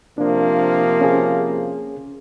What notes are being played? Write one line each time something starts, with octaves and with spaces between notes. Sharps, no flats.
C3 F3 A#3 D4
C#4 G#4